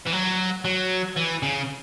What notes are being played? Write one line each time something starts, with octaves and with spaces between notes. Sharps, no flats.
E3
F#3
F#3
E3
C#3